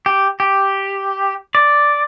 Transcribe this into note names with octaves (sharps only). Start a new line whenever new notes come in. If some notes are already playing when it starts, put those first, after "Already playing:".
G4
G4
D5